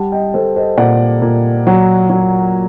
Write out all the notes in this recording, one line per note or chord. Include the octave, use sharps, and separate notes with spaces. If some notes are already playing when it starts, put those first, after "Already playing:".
Already playing: G3 F#5 A5
D#5 G5
G3 A4 C5
C5 D#5
A#2 D5 F#5
A#2
F#3
F#3